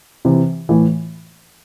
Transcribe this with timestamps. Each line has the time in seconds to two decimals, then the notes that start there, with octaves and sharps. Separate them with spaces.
0.25 C3 E3
0.69 A2 E3